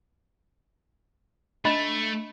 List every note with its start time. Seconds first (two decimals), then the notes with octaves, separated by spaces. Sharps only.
1.65 A3 D4 D#5 B5